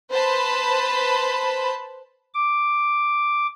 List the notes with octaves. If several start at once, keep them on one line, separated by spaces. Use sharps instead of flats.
B4 C5 A5 B5
D6